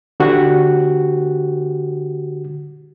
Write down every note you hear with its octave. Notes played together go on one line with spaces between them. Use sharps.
D3 F#4 G4